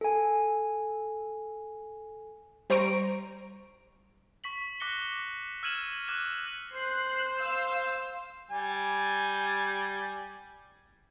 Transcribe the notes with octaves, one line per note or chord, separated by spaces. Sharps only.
A4 G#5
G3 C5 A#5 C#6 D7
C#6 B6 F#7
D6 F#6 A#6 C#7 G7
E6 F6 G#6 D#7 E7 F#7
D6 F#6 G#6 E7 F#7
C5 F#6 C7
F5 E6
G3 G#5